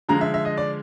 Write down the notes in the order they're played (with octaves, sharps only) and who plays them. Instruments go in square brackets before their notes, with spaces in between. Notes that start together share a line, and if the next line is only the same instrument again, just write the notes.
[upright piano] D3 F3 G#3 A#5
E5
E5
D#5
D5